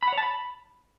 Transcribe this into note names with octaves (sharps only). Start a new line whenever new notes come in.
B5
F#5
C#5
A5
B5